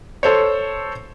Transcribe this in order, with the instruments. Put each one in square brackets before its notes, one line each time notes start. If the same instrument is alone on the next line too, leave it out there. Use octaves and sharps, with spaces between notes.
[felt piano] A4 C5 C#5